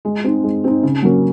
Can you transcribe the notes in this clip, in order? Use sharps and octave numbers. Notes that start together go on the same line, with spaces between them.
G#3
C4 D#4
G#3
C4 D#4
C#3
F#3 A#3 C#4